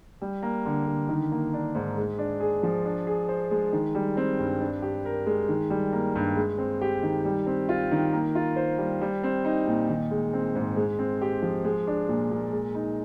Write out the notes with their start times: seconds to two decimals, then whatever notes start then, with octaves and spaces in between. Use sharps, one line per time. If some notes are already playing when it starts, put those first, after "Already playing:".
0.22 G3
0.42 A#3
0.66 D3
0.87 D3
1.09 D#3
1.32 A#3
1.54 D4
1.75 G#2
1.97 G#3
2.18 D4
2.40 G#4
2.63 F3
2.85 D4
3.07 G#4
3.29 C5
3.51 G#3
3.72 D#3
3.95 G3
4.17 C4
4.40 G2
4.61 D4
4.82 G4
5.05 A#4
5.26 G#3
5.48 D#3
5.70 G3
5.92 A#3
6.16 G2
6.36 G#3
6.58 C4
6.81 G4
7.03 D#3
7.25 G3
7.47 C4
7.69 F4
7.91 D#3
8.13 A#3
8.35 F4
8.56 C5
8.78 G3
9.02 G3
9.23 C4
9.45 D#4
9.67 A#2
9.89 D#3
10.11 G#3
10.33 C4
10.55 G#2
10.76 G#3
10.99 C4
11.21 G4
11.42 F3
11.65 G#3
11.87 D4
12.09 A#2
12.31 A#2
12.52 G#3
12.75 D#4